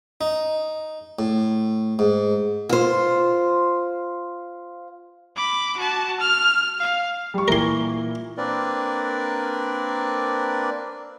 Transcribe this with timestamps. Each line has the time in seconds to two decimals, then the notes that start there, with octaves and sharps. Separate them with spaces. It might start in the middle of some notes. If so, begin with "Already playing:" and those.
0.21 D#4
1.19 A2
1.99 G#2
2.69 F4 C5
5.36 B5 D6
5.77 F#4 A5
6.20 F6
6.80 F5
7.34 G3 C#6
7.48 A#2 E3 A#4 C6
8.38 A#3 C4 D4 A#4 B4 D5